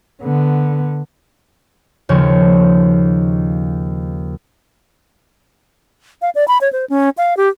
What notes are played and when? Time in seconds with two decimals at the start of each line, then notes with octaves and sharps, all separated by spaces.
0.22 D3 B3
2.09 D#2 C#3 F3 C#5
6.22 F5
6.35 D5
6.48 B5
6.61 C#5
6.73 C5
6.89 C#4
7.17 F5
7.37 G4